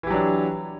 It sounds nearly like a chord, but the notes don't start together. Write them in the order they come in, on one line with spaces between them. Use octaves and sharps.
E3 G4 F#3 D4